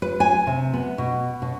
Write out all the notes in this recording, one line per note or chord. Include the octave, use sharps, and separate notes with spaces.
B4
G#5
C3
B3
B2
B2